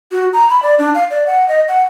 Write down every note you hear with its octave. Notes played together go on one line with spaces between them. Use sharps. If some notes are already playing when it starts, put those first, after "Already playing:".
F#4
A#5
B5
D5
D4
F5
D5
F#5
D#5
F#5